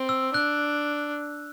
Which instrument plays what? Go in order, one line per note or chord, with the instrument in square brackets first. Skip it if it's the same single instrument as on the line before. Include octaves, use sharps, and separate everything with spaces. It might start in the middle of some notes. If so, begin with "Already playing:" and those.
Already playing: [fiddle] C4
[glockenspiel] E6
[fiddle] D4 [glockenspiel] F#6